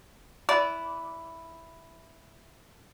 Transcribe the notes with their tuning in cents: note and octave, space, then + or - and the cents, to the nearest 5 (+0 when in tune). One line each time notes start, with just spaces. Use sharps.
E4 +0 B4 +0 D5 -25